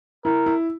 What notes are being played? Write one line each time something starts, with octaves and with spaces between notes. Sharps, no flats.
E4 A#4
E4